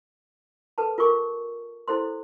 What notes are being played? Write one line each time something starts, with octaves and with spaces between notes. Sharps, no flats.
A4 B4 A5
F4 A#4 G#5 C#6 D6
E4 A4 C5 C6